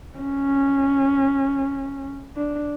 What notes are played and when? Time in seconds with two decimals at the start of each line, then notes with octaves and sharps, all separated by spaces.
0.19 C#4
2.37 D4